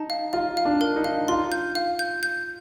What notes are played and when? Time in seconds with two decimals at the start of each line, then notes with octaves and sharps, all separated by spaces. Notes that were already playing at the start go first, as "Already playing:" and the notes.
Already playing: D#4 A5
0.10 F5
0.33 F4 F5
0.57 F5
0.65 D4
0.81 A#4
0.96 D#4
1.04 F5
1.28 F4 C6
1.52 G6
1.75 F5
1.99 G6
2.23 G6